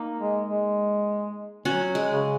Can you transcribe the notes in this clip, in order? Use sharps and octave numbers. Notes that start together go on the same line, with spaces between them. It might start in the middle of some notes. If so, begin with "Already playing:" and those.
Already playing: A#3 D#4
G#3
G#3
F#3 C#4 F#4
G#3
C#3